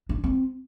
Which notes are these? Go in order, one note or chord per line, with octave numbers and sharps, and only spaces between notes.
D4
C4